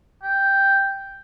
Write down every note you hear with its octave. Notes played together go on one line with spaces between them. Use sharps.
G5